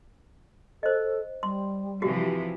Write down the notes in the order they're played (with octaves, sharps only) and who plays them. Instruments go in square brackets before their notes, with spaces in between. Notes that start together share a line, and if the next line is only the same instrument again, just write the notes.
[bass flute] A4 [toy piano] C5 D#5
[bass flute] G3 [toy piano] C6
[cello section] C3 E3 F3 [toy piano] F#4 G4